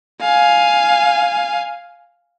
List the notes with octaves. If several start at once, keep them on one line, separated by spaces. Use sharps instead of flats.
F5 G#5